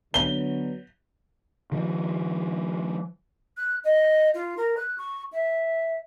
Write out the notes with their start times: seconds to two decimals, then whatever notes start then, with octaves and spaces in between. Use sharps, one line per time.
0.14 D3 F#3 B3 G7
1.72 D#3 F3
3.57 F#6
3.84 D#5
4.35 F4
4.57 A#4
4.77 F#6
4.98 C#6
5.33 E5